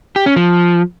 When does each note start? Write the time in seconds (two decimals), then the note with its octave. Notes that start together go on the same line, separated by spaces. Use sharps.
0.16 G4
0.26 C#4
0.36 F3